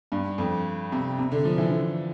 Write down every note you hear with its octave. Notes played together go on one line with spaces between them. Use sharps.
G2
F2
C3
C3
D3
F3
E3
D3